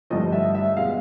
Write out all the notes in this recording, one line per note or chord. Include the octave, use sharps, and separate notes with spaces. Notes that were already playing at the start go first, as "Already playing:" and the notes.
G2 D3 F3 A3 D#5
E5
E5
B2 G#3 F5